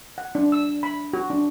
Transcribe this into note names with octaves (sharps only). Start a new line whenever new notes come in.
F#5
D4
E6
B5
F#4
D4